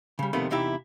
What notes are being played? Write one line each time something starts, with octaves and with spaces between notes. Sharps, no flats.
C#3 G3
F2 C3 D#3 A3 B3 B5
E2 C3 D#4 E4 G4 E5